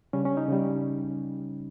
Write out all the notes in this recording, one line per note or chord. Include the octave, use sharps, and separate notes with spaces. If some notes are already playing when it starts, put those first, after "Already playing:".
C#3 G3 C#4
C#4
D#4
C#3 G3